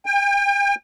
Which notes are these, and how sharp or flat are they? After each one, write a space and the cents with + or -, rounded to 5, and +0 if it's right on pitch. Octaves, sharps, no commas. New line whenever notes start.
G5 +40